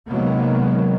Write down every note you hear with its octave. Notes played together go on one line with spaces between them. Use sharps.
C3 D#3 F#3 G#3 A#3 B3